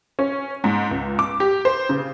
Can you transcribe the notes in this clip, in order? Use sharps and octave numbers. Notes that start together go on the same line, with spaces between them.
C#4
G#2
C#2
D6
G4
C5
C#3